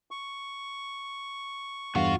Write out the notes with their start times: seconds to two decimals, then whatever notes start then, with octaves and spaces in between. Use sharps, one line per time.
0.11 C#6
1.96 E2 G2 F4 F#4 F5